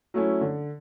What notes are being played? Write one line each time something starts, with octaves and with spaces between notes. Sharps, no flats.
F#3 A3 C#4 E4
D3